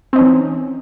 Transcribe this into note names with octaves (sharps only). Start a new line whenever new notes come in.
E3 C4 C#4 D#4